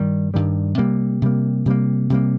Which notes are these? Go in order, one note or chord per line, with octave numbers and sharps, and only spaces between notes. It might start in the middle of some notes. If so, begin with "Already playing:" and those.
Already playing: G2 D#3 G3
G2 D#3 G3
C3 G3 A#3
C3 G3 A#3
C3 G3 A#3
C3 G3 A#3